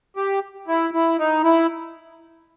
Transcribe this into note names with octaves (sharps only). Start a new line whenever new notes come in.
G4
E4
E4
D#4
E4